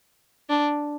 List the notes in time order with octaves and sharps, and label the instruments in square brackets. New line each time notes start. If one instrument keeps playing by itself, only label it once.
[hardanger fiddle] D4